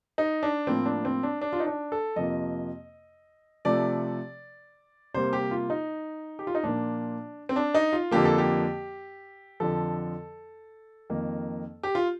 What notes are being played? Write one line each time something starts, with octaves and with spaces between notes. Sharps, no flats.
D#4
D4
A2 F3 A#3 C4
D4
C4
D4
D4
F4
D#4
D4
A4
F2 C3 F3 A#3 D#5
C3 F3 A3 D5
C3 G3 A#3 C5
G4
F4
D#4
G4
F4
D#4
A#2 F3 A#3 D4
C4
D4
D#4
F4
F2 D3 F3 A#3 G4
A4
G4
F2 D3 F3 A4
F2 D#3 A#3
G4
F4